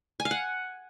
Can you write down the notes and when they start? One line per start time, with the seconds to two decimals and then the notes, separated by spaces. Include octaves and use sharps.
0.20 G#5
0.25 F5
0.31 F#5